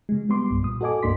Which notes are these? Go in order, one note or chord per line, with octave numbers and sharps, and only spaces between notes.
C#3 G#3
G3 B3 C6 D6
B1 G2
A#2 D#6
F#4 A4 D#5 G#5 D6
C#2 G2 A#3 D4 C6 B6